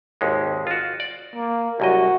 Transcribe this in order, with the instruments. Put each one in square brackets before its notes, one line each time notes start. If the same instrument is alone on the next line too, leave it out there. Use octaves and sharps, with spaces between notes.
[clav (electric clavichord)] G#1 D#2 G#3
F4 F#4
D5
[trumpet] A#3
[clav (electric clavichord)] C2 F#2 D#5 [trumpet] F#4